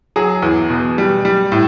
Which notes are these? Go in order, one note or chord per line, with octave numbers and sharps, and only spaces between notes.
F#3 G#4
E2
B2
G3
G3
A2